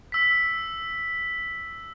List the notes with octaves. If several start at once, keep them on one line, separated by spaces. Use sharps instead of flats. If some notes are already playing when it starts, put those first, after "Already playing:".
E6 B6